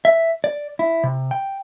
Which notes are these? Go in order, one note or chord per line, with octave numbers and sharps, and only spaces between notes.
E5
D5
E4
C3
G5